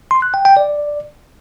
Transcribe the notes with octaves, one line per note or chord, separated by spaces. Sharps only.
C6
F#6
G5
G5
D5